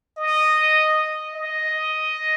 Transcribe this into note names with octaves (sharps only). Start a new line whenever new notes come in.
D#5
D#5